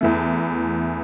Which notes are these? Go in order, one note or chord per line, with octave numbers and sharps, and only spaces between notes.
E2 E3 A3